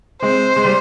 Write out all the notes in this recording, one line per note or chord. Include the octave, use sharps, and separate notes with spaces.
G#3 C4 C5
G#3
G3